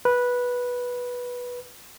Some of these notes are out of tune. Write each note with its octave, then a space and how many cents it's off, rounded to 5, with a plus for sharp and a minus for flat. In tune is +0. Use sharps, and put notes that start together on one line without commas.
B4 -10